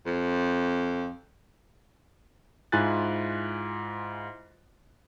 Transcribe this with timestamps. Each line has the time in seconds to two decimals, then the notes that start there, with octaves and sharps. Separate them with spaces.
0.06 F2
2.72 G#2 E4 F4 G#5 F#6 A6